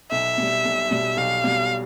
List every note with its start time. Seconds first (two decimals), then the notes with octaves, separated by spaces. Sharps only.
0.11 B1 E5
0.38 B2 G3
0.65 B1
0.91 B2 G3
1.17 B1 F5
1.44 B2 G3